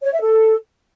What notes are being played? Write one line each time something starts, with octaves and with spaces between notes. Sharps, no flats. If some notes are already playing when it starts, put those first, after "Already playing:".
C#5
E5
A4